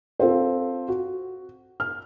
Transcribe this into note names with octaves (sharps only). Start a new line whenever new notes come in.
C4 F4 A4 C5
F#4
F6